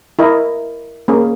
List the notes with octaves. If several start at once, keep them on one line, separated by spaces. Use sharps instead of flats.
E4 A#4 D#5
A#3 C#4 G#4